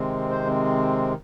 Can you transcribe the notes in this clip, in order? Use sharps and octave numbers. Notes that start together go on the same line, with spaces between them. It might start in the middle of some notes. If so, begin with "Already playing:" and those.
Already playing: C3 D#3 G#3 C4
C5
C4